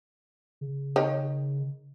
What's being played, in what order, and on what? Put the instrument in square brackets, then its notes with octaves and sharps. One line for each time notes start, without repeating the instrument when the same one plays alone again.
[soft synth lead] C#3
[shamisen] D#3 C#5